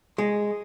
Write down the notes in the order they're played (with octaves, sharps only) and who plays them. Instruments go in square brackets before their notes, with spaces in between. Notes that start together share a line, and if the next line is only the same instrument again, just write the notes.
[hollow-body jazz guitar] G#3